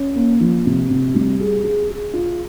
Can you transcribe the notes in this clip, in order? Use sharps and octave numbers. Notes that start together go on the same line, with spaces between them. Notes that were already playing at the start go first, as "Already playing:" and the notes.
Already playing: C#4
A#3
F3
C3
C3
G3
G#4
G#4
G#4
F4